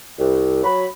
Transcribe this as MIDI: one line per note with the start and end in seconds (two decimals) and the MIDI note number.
0.19 0.63 36
0.63 0.84 54
0.63 0.84 83